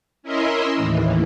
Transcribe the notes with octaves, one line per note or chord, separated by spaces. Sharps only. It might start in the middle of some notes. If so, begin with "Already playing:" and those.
C#4 E4 A#4 D#5 E5 C6
D#2 A2 E3